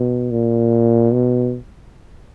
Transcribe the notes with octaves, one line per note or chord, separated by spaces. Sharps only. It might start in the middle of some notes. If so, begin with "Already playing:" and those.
Already playing: B2
A#2
B2